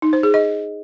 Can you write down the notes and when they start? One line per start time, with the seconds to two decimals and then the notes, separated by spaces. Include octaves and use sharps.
0.02 D#4
0.13 C5
0.23 G#4
0.34 D#5